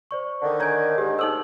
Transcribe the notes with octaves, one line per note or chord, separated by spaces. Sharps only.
C5 D5 C#6
D3 D#3
C#5 G#5 A#5 G6 G#6
G#2 G4
D#4 A4 A#4 C5 E6 F#7